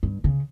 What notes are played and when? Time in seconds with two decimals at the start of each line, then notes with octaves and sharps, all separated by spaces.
0.03 G2
0.24 C#3